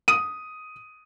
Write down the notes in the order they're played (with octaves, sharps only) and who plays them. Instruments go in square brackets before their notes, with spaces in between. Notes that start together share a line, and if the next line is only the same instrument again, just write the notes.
[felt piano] D#6 D#7